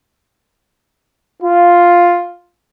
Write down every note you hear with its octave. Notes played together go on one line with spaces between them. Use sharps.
F4